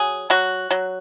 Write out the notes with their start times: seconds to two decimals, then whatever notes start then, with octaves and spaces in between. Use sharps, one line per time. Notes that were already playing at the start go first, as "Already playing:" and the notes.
Already playing: F#3 G#4
0.30 F#3 F#4
0.71 F#3